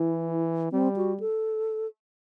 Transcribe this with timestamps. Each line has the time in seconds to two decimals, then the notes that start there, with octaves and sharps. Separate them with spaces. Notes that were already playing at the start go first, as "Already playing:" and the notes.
Already playing: E3 E4
0.72 G3 C4
0.96 F#4
1.20 A4